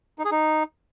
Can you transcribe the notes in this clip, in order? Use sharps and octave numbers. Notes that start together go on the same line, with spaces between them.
D#4
G#4
D#4